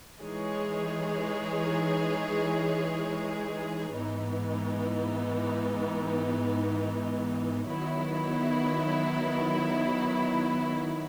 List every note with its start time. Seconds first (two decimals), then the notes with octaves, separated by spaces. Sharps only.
0.20 E3 G#3 D#4 G#4 C#5
3.94 G#2 E3 B3 D#4
7.68 D#3 F#3 B3 E4